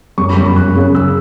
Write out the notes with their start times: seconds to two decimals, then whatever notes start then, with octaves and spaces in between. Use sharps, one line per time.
0.18 F#2 C#6
0.29 B5
0.37 F#2 C#6
0.56 F#2 F#6
0.75 C#3
0.95 C#3 E6